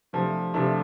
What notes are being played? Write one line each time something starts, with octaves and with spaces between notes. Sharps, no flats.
C3 F3 A3 D4
C3 F3 A3 D4